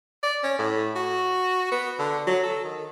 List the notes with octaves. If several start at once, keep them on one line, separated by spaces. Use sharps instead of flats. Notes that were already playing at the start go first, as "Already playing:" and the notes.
D5
C#4
A2
F#4
B3
D3
F#3
A4
D#3